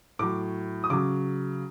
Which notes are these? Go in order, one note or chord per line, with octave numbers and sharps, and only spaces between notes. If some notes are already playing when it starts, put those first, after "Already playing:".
A2 F#3 D6
D#6
C#3 F#3 D6